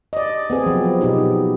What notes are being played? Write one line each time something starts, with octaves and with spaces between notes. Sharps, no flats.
D5 D#5
B3 C4 G#4
F3 F#3
B2 B3 D#4 G4